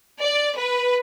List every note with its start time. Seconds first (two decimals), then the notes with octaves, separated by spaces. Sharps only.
0.21 D5
0.56 B4